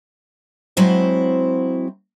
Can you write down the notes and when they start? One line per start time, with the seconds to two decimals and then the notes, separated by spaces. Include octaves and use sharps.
0.77 F#3 G#3 C4 E4 F#4 C5